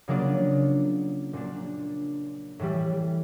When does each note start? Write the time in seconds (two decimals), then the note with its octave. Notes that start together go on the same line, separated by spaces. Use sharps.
0.08 C#3 F#3 A#3 D4 F4
1.33 A#2 F#3 A#3 D4
2.59 A2 E3 G3